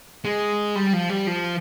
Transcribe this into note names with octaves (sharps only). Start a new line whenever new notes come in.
G#3
G3
F3
G3
F3